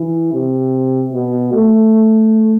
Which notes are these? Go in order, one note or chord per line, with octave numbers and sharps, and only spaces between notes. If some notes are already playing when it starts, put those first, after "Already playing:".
Already playing: E3
C3
B2
A3